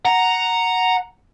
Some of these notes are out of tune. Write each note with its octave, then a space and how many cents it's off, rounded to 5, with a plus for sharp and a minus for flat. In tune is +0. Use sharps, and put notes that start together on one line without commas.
F#5 +0 A#5 +0